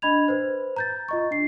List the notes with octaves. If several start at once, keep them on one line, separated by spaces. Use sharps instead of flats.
D4 D#5 B5 G#6 F7
B4 C5
A#5 G6 A6
F4 D#5 C#6
D4 C7